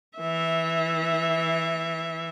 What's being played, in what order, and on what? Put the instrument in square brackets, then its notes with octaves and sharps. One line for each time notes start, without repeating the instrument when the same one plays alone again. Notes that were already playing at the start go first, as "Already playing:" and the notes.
[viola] E3 E5